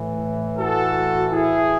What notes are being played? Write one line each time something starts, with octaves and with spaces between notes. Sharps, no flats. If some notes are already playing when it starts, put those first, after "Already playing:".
Already playing: A2 E3
F#4 A4
E4 G#4